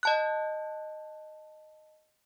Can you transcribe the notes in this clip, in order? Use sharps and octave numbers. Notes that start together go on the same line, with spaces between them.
D#5 A5 F#6